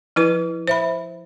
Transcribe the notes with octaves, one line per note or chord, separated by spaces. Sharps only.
F3 E4 B4
C5 E5 B5